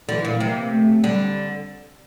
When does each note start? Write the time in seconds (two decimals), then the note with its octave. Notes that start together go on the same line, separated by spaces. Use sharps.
0.09 D3 E3
0.25 A#2
0.40 C3 A#3
0.72 A3
1.04 D3 G3